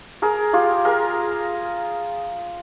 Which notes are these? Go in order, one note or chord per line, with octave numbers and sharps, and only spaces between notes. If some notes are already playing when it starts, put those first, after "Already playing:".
G#4 A#4
F4 G4
G#4 A#4